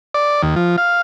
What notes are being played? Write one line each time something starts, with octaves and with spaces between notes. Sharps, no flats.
D5
D#2
F3
F5